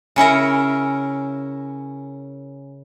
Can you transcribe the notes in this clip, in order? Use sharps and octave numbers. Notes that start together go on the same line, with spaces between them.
C#3 C#4 E4 A#4